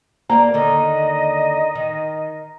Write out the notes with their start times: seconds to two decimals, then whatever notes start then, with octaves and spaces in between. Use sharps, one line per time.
0.29 A#3 D5 A#5
0.54 D#2 D3 D#3 D#5
1.75 D#3